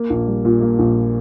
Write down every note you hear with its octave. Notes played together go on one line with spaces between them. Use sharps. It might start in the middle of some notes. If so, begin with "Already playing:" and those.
Already playing: A#3
A#1
G3
A#2
A#3
A#1